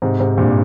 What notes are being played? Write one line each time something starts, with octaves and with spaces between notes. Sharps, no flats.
G#2 C3
G#2 C3
G2 A#2